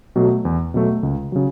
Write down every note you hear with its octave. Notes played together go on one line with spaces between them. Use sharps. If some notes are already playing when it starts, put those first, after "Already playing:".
B2 F#3 A3
E2
B2 F#3 A3
C#2
C#3 F#3